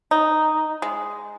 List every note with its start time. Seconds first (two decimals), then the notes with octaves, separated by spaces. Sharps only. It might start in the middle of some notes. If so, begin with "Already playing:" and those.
0.11 D#4
0.82 G#3